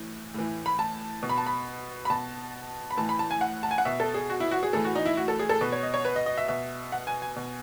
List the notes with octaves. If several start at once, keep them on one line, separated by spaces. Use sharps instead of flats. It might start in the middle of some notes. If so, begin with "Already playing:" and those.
Already playing: A2 E3
A2 E3
B5
A5
B2
B5
A5
B5
B5
B2 A5
B5
A2 E3 A5
B5
A5
G#5
F#5
A5
G#5
F#5
B2 E5
A4
G#4
F#4
E4
F#4
G#4
A2 E3 A4
F#4
D#4
E4
F#4
A4
G#4
A4
B2 B4
C#5
D#5
C#5
B4
D#5
D#5
E5
B2 E5
F#5
G#5
G#5
B2